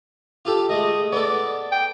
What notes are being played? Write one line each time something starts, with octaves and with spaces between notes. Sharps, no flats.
F4 G4 A4
G#3 A3 D#5
B3 A4 D5
G5